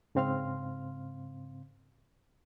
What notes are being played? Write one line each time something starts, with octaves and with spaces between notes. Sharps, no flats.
G#2 C#3 C4 F5 C6 F6